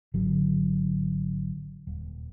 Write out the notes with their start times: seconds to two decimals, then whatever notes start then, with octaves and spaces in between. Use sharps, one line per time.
0.14 G#1 D3 F#3
1.87 D#1